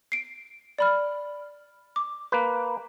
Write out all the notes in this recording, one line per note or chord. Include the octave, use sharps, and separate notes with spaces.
C7 D7
D5 B5 F6
D6
A#3 B4